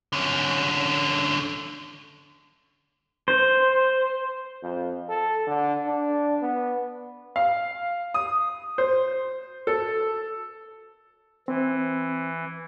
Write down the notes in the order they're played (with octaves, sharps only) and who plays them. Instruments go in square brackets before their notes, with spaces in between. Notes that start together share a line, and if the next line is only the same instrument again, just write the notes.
[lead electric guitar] D3 C#4
[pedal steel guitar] C5
[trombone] F2
A4
D3
D4
B3
[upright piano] F5
D#6
C5
A4
[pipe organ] E3 [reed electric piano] C4